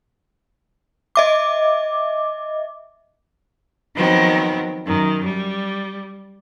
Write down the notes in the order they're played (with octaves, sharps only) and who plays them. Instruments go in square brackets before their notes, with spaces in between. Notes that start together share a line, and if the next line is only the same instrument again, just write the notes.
[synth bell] D#5 E5 D6
[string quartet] D#3 F3 F#3 B3 C4
F#2 D#3
G3